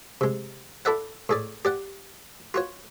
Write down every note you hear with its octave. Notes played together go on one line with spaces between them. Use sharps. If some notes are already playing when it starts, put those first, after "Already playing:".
C3 G#3
E4 A4 D5 E5 F#5
A2 G#4 D5
G4 D5 F#5
F4 F#4 C#5